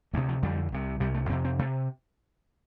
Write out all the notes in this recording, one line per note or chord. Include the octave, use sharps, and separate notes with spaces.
D2 C3 A3
F3
F2 D3 G3
C2 C3
C2 C3 G3
A3
F2 C3 C4
C4
C3 A3